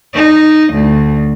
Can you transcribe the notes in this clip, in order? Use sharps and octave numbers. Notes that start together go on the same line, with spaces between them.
D#4
D2